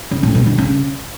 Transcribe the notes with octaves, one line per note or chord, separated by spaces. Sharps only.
C#3
A2
B2
D3
C#3